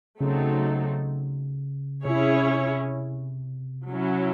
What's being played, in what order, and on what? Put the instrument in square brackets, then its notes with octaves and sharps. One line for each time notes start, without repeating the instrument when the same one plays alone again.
[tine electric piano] C#3 [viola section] F#3 A3 C4 D#4 A4
[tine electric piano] C3 [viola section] C#4 E4 G#4 C#5
[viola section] F#3 C#4 E4